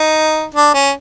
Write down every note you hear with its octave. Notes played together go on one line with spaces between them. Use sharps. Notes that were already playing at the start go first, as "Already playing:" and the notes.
Already playing: D#4
D4
C#4